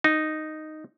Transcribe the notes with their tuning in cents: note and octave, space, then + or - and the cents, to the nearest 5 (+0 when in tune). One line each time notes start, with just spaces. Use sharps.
D#4 -5